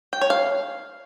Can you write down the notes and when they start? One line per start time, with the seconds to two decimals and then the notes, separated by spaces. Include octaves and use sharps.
0.13 G5
0.21 C#5
0.30 F5